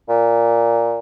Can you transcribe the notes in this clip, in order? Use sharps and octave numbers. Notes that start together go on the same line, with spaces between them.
A#2